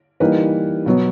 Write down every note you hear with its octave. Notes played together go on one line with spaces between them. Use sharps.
E3 G3 A#3 D#4 B4
B2 F#3 B3